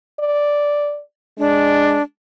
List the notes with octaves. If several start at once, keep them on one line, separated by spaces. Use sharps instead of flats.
D5
G#3 D4